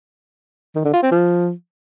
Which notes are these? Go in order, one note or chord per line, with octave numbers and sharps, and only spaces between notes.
D#3
D3
F4
C4
F3